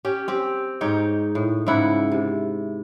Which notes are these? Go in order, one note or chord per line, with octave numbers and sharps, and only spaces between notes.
C#4 G4
C4 G4
G#2 D#4 C#5 G5
A2
G#2 C#3 E4 F#5
C3